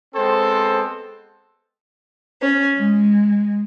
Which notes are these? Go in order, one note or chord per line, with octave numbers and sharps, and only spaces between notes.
G#3 B3 C4 A4 C5
C#4
G#3